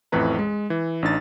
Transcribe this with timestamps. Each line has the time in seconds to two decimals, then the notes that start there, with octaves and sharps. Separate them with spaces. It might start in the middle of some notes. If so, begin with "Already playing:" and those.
0.12 A1 F2 A2 E3 B4 A#5
0.39 G#3
0.70 E3
1.02 A1 D4 D#4 A6